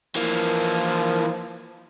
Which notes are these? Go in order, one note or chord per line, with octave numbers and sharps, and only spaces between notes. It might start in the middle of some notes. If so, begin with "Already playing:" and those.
E3 F3 A#3